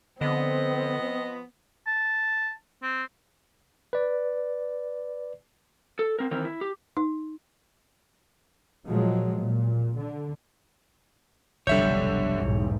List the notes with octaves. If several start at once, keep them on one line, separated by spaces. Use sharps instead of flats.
D3 F3 B3 C4 D#5
A5
C4
B4 D5
A4
C4 A#4
D#3 E3 C4 A#4
E4
G4
D#4
A#2 F3 F#3 G#3
A#2
D3
F1 B1 G2 D3 G3 C#5 E5 G6
B1 E2 G#2